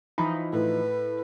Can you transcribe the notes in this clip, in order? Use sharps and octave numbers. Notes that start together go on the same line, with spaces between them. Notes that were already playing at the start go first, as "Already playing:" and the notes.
E3 F3 D#4 B5
A2 B4